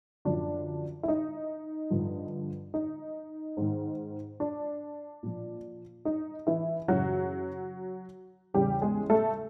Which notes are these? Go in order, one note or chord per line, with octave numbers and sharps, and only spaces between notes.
F#2 D3 F3 D4
E4
D#4
G2 D3 F3
D#4
G#2 D#3
D4
A#2 F3
D#4
E3 E4
F#2 C#3 E3 F#3 F#4
E2 C#3 E3 G3 G4
G#3 G#4
A3 A4